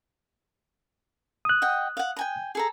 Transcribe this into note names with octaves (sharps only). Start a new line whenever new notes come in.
D#6 F#6
D#5 F#5 G5
F5 F#5
G5 G#5 A#5
G#4 A4 A#5